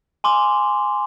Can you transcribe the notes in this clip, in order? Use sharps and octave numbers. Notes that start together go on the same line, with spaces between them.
G#5 C6 D6